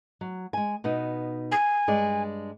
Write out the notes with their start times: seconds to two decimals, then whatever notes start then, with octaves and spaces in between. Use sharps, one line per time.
0.21 F#3
0.53 G#3 G#5
0.84 B2 B3 D#4
1.52 G#5
1.87 G2 G#3 D5